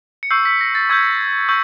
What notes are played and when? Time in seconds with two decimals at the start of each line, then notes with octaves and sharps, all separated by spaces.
0.23 C#7
0.30 C#6 E6 G6 C7
0.46 B6
0.61 A#6
0.75 A6
0.90 C#6 E6 G6 G#6
1.49 C#6 E6 G6